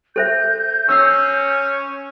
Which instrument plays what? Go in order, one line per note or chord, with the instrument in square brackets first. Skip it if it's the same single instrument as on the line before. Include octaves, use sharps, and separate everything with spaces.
[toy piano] A4 C5 E5 [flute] G6
[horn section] C#4 [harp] E6 A#6 C7